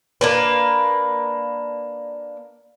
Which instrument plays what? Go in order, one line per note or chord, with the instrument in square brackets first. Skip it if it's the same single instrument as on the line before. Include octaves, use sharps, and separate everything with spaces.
[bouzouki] A#3 D4 B4